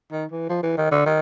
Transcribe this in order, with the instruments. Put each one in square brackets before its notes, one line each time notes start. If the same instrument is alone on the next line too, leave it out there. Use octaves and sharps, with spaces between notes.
[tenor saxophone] D#3
E3
F3
E3
D#3
D3
D#3